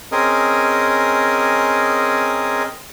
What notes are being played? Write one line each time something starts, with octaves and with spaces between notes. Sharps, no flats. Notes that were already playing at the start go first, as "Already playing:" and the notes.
C4 C#4 G#4 A#4 D#5